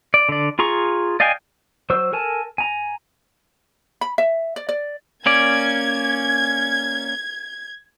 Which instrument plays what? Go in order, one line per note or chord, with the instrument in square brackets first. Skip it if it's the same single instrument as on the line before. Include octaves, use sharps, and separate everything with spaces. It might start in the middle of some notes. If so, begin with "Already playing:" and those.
[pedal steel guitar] D5
D3 D5
F4 G#4 A#5 C#6
D5 D#5 F5 G5 G#5
F#3 C5 C#6 E6
A4 A#4 G#5 A5
G#5 A#5
[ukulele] B5
E5
D5
D5
[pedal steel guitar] A#3 C#4 D5 [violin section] G#6